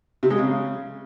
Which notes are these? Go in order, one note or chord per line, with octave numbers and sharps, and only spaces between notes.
C3
G#3
C#3